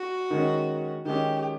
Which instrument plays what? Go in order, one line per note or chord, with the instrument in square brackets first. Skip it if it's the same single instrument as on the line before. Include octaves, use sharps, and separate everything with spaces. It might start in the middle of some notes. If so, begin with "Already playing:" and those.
Already playing: [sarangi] F#4
[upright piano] D#3 G#3 C#4
[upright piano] D#3 G#3 C#4 [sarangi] G4